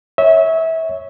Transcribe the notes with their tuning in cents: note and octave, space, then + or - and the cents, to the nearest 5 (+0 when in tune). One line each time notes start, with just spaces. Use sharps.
C#5 +0 E5 -25